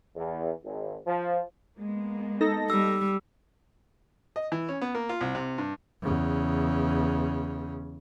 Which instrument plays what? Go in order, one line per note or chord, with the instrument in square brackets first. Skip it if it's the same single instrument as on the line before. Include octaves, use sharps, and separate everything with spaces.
[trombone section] E2
G#1
F3
[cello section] G#3 A#3 B3
[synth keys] D#4 A4 A#6
[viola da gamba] G3 [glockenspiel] E6
[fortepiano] D#5
E3
C#4
B3
A#3
F4
C2
C3
G2
[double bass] E2 C#3